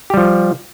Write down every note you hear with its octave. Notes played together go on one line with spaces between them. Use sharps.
F3 G3 G4